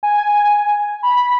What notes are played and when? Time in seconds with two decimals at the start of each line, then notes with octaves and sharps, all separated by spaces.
0.03 G#5
1.03 B5